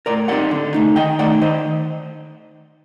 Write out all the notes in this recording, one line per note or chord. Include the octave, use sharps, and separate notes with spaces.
A2 A#4 D5
G3 C4 D#4 D5 F#5
D3
A3 D#4
D#3 D#5 G5
A3 D#4 D5 F#5
D#3 C5 D#5